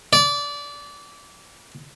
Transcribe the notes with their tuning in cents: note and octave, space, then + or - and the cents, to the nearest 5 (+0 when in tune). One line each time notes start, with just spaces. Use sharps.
D5 -20